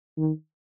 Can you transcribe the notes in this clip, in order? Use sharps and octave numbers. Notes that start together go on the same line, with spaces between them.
D#3